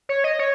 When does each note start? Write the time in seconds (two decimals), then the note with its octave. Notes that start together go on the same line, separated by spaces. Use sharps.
0.09 C#5
0.24 D#5
0.39 C#5